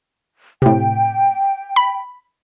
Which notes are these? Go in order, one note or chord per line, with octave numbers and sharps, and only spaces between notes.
A2 C3 G5
B5